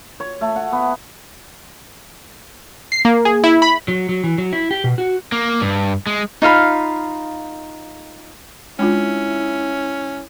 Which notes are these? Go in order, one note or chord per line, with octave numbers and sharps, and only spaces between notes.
C#5
A3
F#5
B3
C7
A#3
G#4
E4
B5
F#3
F#3
E3
F#3
E4
G4
B2
F#4
A#3
G2
G#3
D#4 F4 F5 B5
G#3 C#4 D4 E4 F4